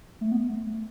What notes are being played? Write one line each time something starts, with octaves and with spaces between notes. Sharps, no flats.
A3
B3
A3
A3